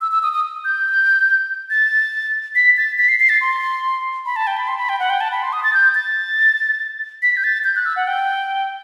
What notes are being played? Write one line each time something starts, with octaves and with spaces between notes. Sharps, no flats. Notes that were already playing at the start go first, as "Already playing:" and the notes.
E6
E6
D#6
D#6
G6
A6
B6
A6
B6
C7
C7
A6
C6
B5
A5
G5
B5
C6
B5
G5
F#5
G5
A5
B5
C6
D#6
A6
G6
A6
B6
G6
A6
G6
F#6
E6
F#5
G5